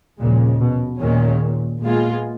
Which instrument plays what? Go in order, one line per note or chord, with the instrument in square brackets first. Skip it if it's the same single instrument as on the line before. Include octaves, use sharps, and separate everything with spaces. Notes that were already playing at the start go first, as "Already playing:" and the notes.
[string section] D#2 C#3 F3 G#3 [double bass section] A#2
[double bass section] B2
[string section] D#2 D#3 G#3 C#4 [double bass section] A#2
[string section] A#2 G#3 B3 F4 G#4